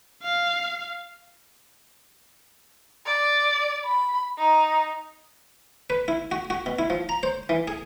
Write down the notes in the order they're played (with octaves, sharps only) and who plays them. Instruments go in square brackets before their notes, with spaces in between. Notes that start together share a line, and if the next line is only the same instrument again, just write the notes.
[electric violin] F5
[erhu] D5
B5
D#4
[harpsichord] B4
E4
F#4
F#4
B2
E4
F3
A#5
C5
E3
G#4